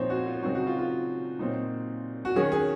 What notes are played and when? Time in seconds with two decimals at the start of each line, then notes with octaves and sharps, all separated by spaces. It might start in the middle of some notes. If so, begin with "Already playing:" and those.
Already playing: A#2 F3 C4 D#4 C5 C#5
0.10 F#4
0.26 F4
0.43 C#3 F#3 C4 D#4 F#4
0.55 F#4
0.67 F4
0.79 F4
1.39 A#2 F#3 C4 D#4
2.25 F#4
2.36 D#3 F#3 C#4 G#4
2.52 G#4